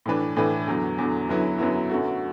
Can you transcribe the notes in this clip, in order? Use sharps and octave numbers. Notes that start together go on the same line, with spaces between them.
A2 E3 D4 B4
A2 E3 D4 B4
E2 D3 F#3
E2 D3 F#3
F#2 D3 F#3 B3 E4
F#2 D3 F#3 B3 E4
F#2 D3 A3 F#4